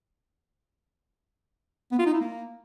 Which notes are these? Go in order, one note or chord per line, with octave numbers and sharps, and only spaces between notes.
B3
F4
D#4
E4
A#3